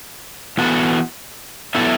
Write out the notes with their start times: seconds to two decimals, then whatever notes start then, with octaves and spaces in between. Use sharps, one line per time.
0.58 E3 B3 F#4 A4
1.75 F#3 B3 E4 A4 E5